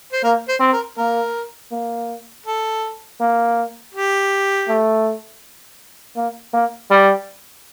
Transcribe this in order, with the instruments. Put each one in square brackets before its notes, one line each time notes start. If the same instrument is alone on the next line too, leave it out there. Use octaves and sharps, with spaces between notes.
[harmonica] C5
[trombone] A#3 [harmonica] A#4
[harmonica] C5
[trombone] C4
[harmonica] A#4
[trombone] A#3 [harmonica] A#4
[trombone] A#3
[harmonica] A4
[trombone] A#3
[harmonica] G4
[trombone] A3
A#3
A#3
G3